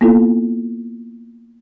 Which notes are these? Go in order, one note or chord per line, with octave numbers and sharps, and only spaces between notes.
A#3 B3 E4 F4 A4